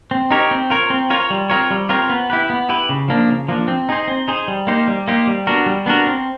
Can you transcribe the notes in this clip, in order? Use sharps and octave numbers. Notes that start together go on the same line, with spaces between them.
C4
D#4 G4 A#4 C#5
C4
F4 A#4 C#5
C4
F4 A#4 C#5
G3
C4 F4 A#4 C#5
G3
C4 F4 A#4 C#5
B3
E4 G4 B4
B3
E4 G4 B4
C#3
F3 A#3 D4
C#3
F3 A#3 D4
C4
D#4 G#4 C5
C4
D#4 G#4 C5
G3
A#3 D#4 G4 C5
G3
A#3 D#4 G4 C5
G3
B3 D4 F#4 A#4
G3
B3 D4 F#4 A#4
C4